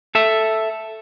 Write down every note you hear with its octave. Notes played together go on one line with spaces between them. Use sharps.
A4 E5